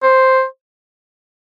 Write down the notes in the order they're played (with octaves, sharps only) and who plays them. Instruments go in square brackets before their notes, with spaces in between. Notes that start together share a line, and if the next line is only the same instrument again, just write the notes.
[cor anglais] C5